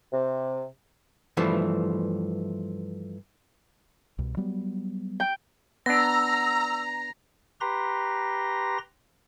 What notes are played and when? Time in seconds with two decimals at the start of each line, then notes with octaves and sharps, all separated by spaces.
0.13 C3
1.37 G2 E3 F3 A3
4.18 C2 B2
4.37 F#3 G3 B3
5.20 G5
5.86 B3 D4 A#5 E6 A#6
7.61 G4 B4 A#5 C6 A#6